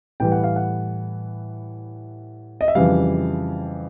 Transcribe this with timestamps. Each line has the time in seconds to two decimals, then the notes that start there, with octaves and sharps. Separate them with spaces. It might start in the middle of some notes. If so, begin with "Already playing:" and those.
0.20 A2 E3 G3 G5
0.32 F#5
0.44 F5
0.56 F#5
2.61 D#5
2.68 E5
2.75 F2 C#3 E3 G3 F5